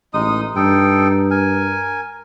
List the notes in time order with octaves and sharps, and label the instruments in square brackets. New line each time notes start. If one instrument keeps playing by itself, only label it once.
[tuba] A1 [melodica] G#3 D#4 D#6
[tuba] G2 [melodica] D#4 A4 G5
[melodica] A#4 G#5